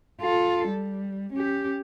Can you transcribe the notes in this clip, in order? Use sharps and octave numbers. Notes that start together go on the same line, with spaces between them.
F4 A4
G3
C#4 G4